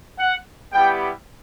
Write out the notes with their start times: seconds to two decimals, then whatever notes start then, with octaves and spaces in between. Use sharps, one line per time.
0.18 F#5
0.73 G3 B3 E4 G4 G5